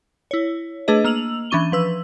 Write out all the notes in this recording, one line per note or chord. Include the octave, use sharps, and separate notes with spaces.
E4 C#5
A3 D4 G#4 B4 D#5
A#3 E6 F7 F#7
E3 C#4 D4 C#6 D#7 G7
F3 B4 E6